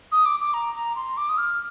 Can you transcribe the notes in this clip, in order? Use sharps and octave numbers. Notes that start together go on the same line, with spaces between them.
D#6
D6
D6
A#5
A#5
C6
D6
D#6
F6